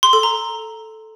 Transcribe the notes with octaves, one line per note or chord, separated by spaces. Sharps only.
C6
A4
A#5